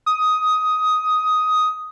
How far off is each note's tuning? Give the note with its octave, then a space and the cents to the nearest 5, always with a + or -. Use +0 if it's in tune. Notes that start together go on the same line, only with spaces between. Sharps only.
D#6 +10